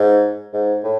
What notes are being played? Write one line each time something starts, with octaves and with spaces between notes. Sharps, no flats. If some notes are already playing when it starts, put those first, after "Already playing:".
Already playing: G#2
G#2
A2